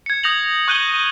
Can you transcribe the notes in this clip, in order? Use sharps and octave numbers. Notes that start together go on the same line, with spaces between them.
G#6 C#7
D#6 G6 A#6 F7 F#7
C#6 F#6 G6 D#7 F#7 G7